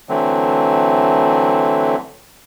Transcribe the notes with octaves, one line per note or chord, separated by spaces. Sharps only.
D3 E3 F#3 A3 C4